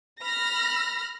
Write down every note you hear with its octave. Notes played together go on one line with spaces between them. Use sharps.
B5 F6 A#6